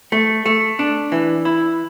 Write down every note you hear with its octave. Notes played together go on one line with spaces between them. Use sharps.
A3
A3
D4
E3
E4